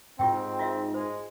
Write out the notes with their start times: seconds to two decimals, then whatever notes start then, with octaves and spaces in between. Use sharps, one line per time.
0.19 G#2 C4 F4 G4 G5
0.59 F4 F#4 E5
0.94 G#3 C5